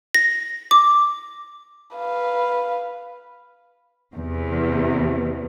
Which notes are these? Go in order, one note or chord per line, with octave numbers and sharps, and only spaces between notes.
A#6
D6
B4 F5
E2 C3